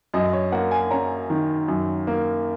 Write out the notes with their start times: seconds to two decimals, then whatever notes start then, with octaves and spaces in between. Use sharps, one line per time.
0.14 F#2 D#5
0.33 C#5
0.52 A#3 F#5
0.71 G#5
0.91 C#4 A#5
1.30 D#3
1.68 F#2
2.07 A#3